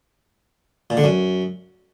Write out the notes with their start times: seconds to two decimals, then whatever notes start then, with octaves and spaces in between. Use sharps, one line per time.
0.90 A#2
0.97 D3
1.04 F#2